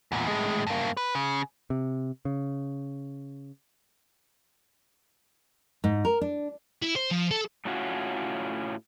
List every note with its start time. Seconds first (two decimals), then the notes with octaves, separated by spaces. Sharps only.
0.12 E2 A#2
0.28 A2 G#3
0.67 G2 A#3
0.97 B4
1.15 C#3
1.70 C3
2.25 C#3
5.84 G#2
6.05 A#4
6.21 D4
6.82 E4
6.96 C5
7.11 F3
7.31 A4
7.65 A2 A3 C#4 F4 F#4